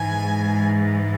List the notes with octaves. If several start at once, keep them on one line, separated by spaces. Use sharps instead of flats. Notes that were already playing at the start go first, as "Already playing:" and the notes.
Already playing: G#2 E3 G#3 G#5